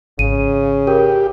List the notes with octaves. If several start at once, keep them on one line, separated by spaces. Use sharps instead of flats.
G#1 C#3 D#7
G4 A#4